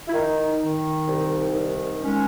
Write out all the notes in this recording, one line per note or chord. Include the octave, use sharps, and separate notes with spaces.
E4
D#3 D#4
D#3
C2
D#3
G#3 C#4